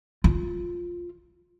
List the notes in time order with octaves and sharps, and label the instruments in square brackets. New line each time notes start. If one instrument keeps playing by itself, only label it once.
[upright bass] F4